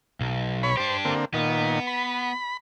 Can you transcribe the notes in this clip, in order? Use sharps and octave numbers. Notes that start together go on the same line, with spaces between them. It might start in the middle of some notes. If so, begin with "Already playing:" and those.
B1
C#5 B5
D4 G4 C5
D3 A#3 C4
A#2 D#3 B3
B5